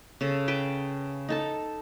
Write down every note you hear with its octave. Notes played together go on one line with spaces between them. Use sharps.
C#3 A4
B4 G5 A5
D#4 A4 A5